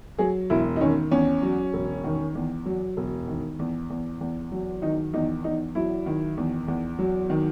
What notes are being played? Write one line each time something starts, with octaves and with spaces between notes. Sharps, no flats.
F#3 G#4
E1 E4
D#4
D#3 C#4
E2 C#4
F#3
E1
D#3
E2
F#3
E1
D#3
E2
E2
E2
F#3
D#3 D#4
E2 D#4
E2 D#4
F#3 E4
D#3
E2
E2
F#3
D#3